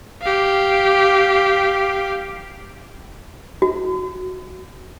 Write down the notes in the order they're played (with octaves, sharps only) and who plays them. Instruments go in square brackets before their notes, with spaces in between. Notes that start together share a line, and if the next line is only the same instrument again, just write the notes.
[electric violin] G4 F5
[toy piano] F#4